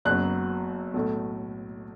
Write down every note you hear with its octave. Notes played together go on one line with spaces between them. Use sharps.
F#1 F#2 F#3 B3 F#6
B1 A2 A3